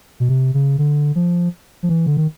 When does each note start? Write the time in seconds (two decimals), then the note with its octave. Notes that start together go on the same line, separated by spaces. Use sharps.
0.20 B2
0.29 C3
0.54 C#3
0.78 D3
1.15 F3
1.83 F3
1.89 E3
2.06 D3
2.17 D#3